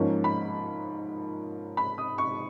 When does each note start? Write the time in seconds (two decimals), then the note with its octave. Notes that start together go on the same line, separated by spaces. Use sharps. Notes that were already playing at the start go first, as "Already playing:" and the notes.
Already playing: G#2 F3 A#3 C#4
0.24 B5
1.77 B5
1.98 D#6
2.18 C#6